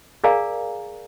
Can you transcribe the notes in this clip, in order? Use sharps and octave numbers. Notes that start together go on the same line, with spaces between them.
G#4 A#4 D5 F5 G#5 A#5